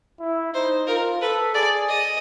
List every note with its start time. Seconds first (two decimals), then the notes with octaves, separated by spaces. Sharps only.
0.20 E4
0.54 D#4 C5
0.87 F4 A#4
1.21 A4 B4
1.54 G#4 D5
1.89 D#5